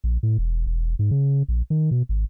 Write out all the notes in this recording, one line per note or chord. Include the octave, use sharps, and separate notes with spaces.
A#1
A2
E1
E1
G#2
C#3
A#1
D#3
B2
G#1